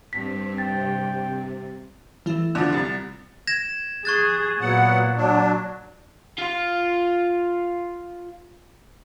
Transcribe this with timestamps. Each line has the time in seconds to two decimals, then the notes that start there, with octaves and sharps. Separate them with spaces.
0.13 G2 C4 B6
0.58 C3 G5 A6
2.26 E3 A3 E4
2.55 D3 F3
2.72 C2 A6
3.47 G#6 A#6 E7
4.05 G#4 C#6 F#6 A6
4.61 A#2 F#3 B3 F#5
5.17 F#3 D4
6.38 F4 F5